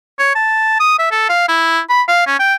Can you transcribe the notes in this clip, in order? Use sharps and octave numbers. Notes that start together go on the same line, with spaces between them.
C#5
A5
D#6
E5
A4
F5
E4
B5
F5
C#4
G5